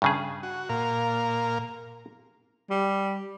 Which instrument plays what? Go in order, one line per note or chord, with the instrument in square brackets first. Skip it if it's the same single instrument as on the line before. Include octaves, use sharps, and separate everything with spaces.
[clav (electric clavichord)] G2 C#3 G#4
[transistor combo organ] F#4
A#2 A#4 F5
[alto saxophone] G3